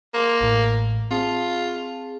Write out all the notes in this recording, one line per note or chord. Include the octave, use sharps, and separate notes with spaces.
A#3 C6
A1 A2
C4 F4 G#4 A5